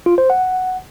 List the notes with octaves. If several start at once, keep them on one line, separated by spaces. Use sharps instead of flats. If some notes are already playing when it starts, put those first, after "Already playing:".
F4
C5
F#5